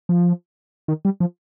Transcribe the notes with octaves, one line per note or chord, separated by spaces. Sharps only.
F3
D#3
G3
F3